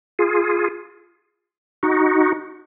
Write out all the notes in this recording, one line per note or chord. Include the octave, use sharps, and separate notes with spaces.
F4 G#4
D#4 F#4